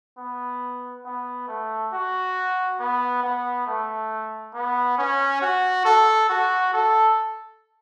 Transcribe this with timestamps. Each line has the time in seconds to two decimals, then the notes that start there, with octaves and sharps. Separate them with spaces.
0.18 B3
1.05 B3
1.48 A3
1.93 F#4
2.80 B3
3.24 B3
3.66 A3
4.54 B3
4.98 C#4
5.42 F#4
5.85 A4
6.29 F#4
6.73 A4